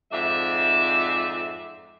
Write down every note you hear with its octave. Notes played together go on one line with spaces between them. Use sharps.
F2 G#2 D5 E5